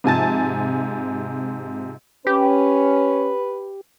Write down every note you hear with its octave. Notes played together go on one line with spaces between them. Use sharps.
G#2 C3 F3 G#5 A5 A6
C#4 G4 B4